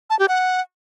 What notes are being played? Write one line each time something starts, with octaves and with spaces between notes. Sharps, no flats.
A5
G4
F#5